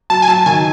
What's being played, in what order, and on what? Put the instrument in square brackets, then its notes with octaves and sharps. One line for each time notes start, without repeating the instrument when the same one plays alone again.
[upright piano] F#3 [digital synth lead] A5
[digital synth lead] G#5
[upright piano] F#3 [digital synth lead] A5
[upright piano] D#3 [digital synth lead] G#5